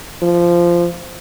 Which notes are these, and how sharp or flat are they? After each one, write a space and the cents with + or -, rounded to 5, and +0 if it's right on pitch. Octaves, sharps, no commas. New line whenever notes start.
F3 -15